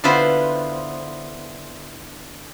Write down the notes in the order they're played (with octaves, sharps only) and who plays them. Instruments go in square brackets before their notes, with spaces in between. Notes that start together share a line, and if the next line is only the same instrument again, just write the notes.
[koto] D3 B3 E4 F4 B4 C5